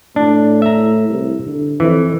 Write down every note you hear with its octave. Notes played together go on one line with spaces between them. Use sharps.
A2 D4
E5 A#5
C2
D3
F2 E3